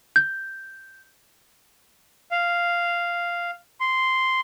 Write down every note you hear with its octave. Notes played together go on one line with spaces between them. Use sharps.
G6
F5
C6